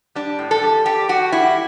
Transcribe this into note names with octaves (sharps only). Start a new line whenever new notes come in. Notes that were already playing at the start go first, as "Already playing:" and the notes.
G3 D4
A2
A4
G3
G3 G4
G3 F#4
G3 E4